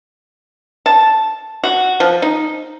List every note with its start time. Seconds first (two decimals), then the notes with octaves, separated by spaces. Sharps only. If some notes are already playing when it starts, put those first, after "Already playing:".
0.86 A5
1.64 F#4
2.00 F3
2.22 D#4